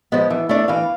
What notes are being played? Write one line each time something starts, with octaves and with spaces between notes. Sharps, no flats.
F3 G#3 B3
E3
A3 D4
E3 F5